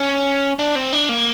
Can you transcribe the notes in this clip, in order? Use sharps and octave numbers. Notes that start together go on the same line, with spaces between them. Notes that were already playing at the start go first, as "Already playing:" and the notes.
Already playing: C#4
D4
C4
D4
A#3